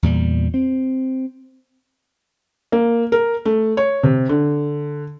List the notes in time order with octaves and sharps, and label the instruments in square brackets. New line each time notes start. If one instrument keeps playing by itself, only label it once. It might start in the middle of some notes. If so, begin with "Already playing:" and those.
[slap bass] E2 A#2 G3
C4
[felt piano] A#3
A#4
A3
C#5
C3
D3